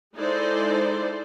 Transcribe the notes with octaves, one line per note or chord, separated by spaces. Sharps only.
G#3 D#4 E4 A4 C5 D5